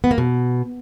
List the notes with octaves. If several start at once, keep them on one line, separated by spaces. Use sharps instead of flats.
B3
A#3
B2